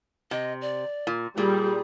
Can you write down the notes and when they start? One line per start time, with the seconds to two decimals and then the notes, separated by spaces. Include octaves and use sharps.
0.31 C3 D#5
0.61 D5
1.07 A#2
1.38 A#2 G3 G#4